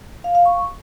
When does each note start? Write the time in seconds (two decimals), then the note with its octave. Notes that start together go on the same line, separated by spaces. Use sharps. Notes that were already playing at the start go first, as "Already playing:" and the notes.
0.24 F5
0.35 F5
0.45 C#6